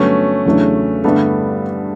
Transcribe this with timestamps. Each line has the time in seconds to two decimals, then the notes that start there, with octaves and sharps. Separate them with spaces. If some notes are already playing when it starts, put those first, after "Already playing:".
Already playing: G2 D3 F#3 A3 B3 C#4
0.46 E2 C#3 F#3 A3 D4
1.04 G2 D3 G3 A3 B3 D4